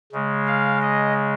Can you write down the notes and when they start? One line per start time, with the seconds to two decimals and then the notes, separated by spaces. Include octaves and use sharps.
0.12 C#3 G#3
0.47 F5
0.82 D#5